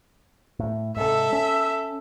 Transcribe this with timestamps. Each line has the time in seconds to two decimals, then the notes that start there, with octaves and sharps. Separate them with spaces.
0.59 A2
0.97 G#2 C3 A4 E5
1.33 C#4